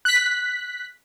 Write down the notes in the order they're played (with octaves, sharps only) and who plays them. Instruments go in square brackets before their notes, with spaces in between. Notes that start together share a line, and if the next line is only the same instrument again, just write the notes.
[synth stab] F#6 B6